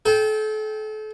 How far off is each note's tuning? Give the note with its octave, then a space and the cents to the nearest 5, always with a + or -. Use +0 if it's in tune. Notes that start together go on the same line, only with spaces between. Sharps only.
A4 -35 G5 +0